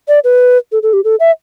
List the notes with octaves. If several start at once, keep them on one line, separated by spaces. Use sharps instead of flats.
D5
B4
A4
A4
G4
A4
E5